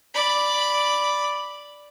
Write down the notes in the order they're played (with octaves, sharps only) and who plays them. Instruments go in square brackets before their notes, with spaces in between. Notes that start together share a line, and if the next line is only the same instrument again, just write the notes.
[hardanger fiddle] D5 B5